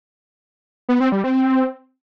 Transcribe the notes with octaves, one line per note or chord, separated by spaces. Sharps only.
B3
C4
G3
C4